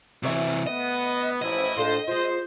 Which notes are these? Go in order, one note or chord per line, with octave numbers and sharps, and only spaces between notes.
D2 C3 E3 C#5 E5
B3 D#5
A1 F3 C#4 E4 D#5
A2 D4 F4 A4 C5
G#3 F4 C5